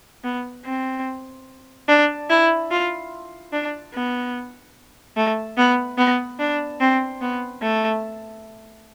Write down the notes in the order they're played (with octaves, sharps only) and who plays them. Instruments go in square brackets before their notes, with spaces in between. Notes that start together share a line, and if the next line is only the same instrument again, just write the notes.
[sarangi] B3
C4
D4
E4
F4
D4
B3
A3
B3
B3
D4
C4
B3
A3